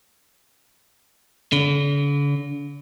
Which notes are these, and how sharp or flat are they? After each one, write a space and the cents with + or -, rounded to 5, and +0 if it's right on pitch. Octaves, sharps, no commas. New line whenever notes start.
D3 -45